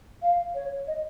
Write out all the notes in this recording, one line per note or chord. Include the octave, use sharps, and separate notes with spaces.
F5
C#5
D#5